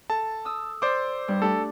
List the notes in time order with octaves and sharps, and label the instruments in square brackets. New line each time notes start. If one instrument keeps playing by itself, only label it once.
[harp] A4 [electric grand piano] A5
[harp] D#6 E6
[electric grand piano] C5 D6 [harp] D5 E6
[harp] G2 G3
[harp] A3 D4 G4 [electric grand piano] A4